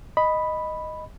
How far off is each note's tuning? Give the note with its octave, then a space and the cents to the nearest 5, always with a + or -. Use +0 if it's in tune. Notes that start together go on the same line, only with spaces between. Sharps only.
D#5 +0 B5 +0